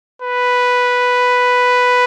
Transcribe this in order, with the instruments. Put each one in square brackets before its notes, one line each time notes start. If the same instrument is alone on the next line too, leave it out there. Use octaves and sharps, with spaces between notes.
[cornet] B4